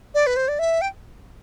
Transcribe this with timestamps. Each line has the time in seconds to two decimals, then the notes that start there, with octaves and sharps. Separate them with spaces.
0.15 D5
0.27 B4
0.36 C5
0.48 D5
0.59 E5
0.81 G5